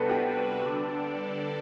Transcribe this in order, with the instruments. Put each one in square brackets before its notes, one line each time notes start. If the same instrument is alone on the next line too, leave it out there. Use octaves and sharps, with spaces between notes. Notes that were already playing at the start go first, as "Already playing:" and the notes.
Already playing: [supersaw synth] C3 G3 D4 F#4 B4 [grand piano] B3 A4
[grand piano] G4
[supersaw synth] D3 G3 D4 A4 D5